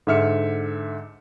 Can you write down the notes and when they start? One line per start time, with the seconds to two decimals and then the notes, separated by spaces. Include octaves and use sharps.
0.07 G#2 D3 E5 F6 C#7